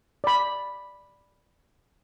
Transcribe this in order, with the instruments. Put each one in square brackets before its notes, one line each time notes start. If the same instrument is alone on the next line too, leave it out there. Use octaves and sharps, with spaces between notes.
[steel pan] D5 B5